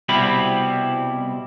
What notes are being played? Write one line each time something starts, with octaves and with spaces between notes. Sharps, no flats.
C2 B2 G3 C4 E4 B5